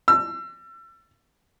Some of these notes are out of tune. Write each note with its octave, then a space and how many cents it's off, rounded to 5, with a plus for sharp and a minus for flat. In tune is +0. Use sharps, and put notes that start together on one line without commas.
E6 +35